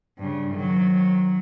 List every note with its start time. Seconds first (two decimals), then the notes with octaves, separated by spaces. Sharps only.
0.18 G2 C#3
0.55 D#3 F#3